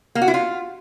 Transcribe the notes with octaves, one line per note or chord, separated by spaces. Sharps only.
A#3
F#4
E4
F4